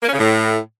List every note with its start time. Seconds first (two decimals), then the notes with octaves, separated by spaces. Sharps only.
0.03 A#3
0.08 C#4
0.13 C#3
0.18 A2